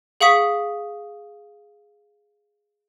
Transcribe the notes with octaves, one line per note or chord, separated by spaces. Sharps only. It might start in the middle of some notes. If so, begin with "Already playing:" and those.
G#4 F5 F#5 C#6 D#6 B6